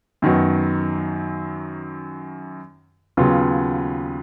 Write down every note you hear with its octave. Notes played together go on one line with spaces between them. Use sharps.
F#2 D#3 F#3 B3
D#2 C#3 F#3 B3 F4